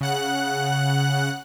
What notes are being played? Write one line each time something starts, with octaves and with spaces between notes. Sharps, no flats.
C#3 F#5 F#6